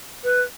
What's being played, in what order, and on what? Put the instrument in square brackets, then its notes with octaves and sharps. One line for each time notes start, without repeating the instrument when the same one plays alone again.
[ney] B4